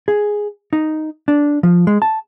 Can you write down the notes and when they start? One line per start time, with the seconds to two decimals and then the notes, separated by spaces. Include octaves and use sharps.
0.08 G#4
0.73 D#4
1.28 D4
1.63 F3
1.87 G#3
2.02 A5